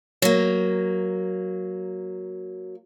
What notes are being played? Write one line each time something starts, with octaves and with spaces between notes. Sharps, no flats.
F#3 A#3